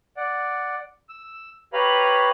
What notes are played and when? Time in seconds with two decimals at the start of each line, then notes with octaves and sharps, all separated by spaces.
0.17 D5 F#5
1.09 E6
1.73 G4 B4 C#5 F5 A#5 B5